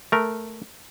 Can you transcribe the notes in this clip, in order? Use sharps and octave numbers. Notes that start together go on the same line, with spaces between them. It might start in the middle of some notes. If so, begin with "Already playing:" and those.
A3 A#4